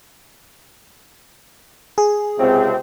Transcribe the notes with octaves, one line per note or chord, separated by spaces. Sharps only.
G#4
C#2 C3 C4